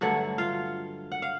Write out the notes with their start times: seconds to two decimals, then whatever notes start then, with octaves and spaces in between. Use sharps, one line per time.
0.01 G2 D3 F#3 A3 F#4 F#5
0.38 F4 F5
1.12 F#5
1.22 F5